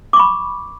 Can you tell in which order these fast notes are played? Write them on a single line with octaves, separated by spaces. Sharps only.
D6 C#6 B5